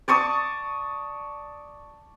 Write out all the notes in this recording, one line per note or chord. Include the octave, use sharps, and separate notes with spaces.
D5 A5 C#6 D#6